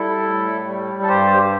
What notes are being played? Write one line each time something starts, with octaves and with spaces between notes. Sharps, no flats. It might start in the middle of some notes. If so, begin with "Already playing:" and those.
Already playing: G3 E4 A4
A2
G3
A4
G2 G4 C5